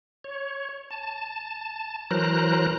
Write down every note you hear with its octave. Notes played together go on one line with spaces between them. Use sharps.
C#5
A5
E3 F#3 A#4 C5 A#5 F#6